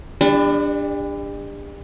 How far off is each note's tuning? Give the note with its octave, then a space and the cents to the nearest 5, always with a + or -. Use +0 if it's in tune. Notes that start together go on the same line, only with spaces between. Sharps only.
G3 +40 D4 +0